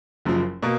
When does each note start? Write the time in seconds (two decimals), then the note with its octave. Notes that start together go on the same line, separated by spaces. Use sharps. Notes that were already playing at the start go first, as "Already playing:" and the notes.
0.25 F#1 F#2 F3
0.63 B2 A#3